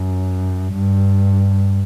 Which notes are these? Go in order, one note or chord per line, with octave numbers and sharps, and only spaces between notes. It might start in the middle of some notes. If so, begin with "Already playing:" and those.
Already playing: F#2
G2